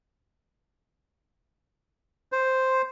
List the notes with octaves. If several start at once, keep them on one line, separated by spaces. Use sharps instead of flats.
C5